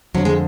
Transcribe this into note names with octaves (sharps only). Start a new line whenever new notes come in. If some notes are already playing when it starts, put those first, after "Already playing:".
F2 D3 F#3
G#3